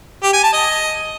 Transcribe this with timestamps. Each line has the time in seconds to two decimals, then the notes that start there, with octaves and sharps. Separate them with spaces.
0.23 G4
0.33 G#5
0.43 A5
0.53 D#5